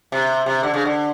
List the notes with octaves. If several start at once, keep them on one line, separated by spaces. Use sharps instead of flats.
C3
C3
D3
C#3
D3